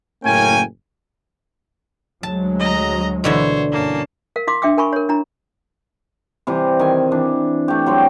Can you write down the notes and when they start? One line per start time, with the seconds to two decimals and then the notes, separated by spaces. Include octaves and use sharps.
0.25 F#1 A2 A#3 C#4 G5 G#5
2.23 D2 F#3 G#3 A5
2.59 D#5 A#5
3.24 B2 D3 E3 C5 C#5
3.72 G1 A#3 C#4 A5
4.36 A#4 F5
4.47 E4 F5 C6 D6
4.62 D4 E5 G5 D6 E6
4.77 A#4 G#5 B5 C#6
4.93 A#4 C#5
5.09 D4 E4 A#5
6.47 C3 E3 G3
6.79 D#3 G#5
7.11 E3 D4
7.68 A3 G4
7.86 F#3 G3 C4